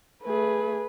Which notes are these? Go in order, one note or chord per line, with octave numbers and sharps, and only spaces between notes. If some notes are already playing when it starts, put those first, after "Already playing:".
A3 G#4 B4